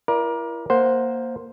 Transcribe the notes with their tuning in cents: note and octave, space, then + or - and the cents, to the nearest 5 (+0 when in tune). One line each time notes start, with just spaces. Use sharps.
E4 +30 A#4 +30 D5 +0
A#3 +0 C5 +0 F#5 -10